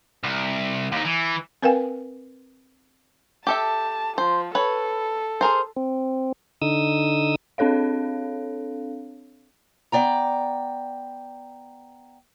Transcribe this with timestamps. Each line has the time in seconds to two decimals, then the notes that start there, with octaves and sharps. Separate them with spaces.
0.24 C2
0.92 D#2 D#4
1.05 E3
1.62 C4 A#4 B4 F5 G5 G#5
3.47 G4 A4 E5 A5
4.18 F3 C5
4.55 A4 B4 C#5
5.41 G#4 A#4 C5
5.76 C4
6.62 D3 D#4 D#6 E6
7.58 C4 D4 A4 C#5 F5
9.92 B3 D5 G5 A#5